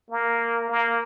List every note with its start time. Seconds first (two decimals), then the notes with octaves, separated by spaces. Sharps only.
0.11 A#3
0.69 A#3